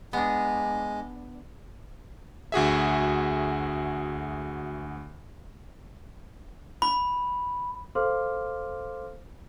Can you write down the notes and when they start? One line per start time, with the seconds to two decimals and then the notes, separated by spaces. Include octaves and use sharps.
0.13 G#3 B3 D4
2.52 D2 F#4 G#4 E5
6.82 B5
7.95 A4 C5 F5 C6 D6 F6